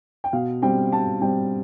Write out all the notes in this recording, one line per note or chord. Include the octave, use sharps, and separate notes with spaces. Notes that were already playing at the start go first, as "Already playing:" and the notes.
G5
B2 F5
G3 C4 G5
B2 A5
G3 C4 G5